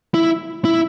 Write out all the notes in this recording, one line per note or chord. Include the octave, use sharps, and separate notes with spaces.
E4
E4